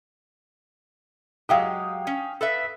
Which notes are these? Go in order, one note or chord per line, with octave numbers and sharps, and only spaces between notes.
F#3 G#3 G4 F5 G5 D#6
C#4
A4 B4 E5